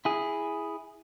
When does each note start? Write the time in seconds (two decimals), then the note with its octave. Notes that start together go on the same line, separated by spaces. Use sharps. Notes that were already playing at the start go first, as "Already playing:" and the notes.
0.05 E4 G#4